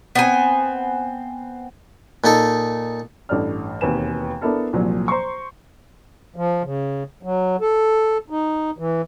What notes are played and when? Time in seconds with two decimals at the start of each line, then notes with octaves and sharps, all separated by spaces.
0.15 B3 C4 G#5
2.24 A#2 D#4 A4
3.29 A1 G2 A4 D5 F6
3.81 E1 D#2 C4 B4 G#5 E7
4.41 B3 D4 E4 A4 A#4
4.73 C2 A#2 F3 F#3
5.08 C5 A#5 C6 C#6
6.36 F3
6.64 C#3
7.23 F#3
7.61 A4
8.30 D#4
8.78 E3